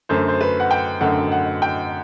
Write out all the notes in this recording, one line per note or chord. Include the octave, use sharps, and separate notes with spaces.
F#2 D3 A3 C5
C5
B4
F#5
G5
F#2 D3 A3 F#5
F#5
G5